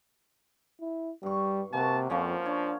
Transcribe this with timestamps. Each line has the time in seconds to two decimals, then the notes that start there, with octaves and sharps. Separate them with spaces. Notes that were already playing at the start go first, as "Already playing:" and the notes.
0.81 E4
1.23 G2 G3 C#6
1.73 C3 A#3 F#4 A5
2.10 F2 F3 C#4 F5
2.46 D4 C#5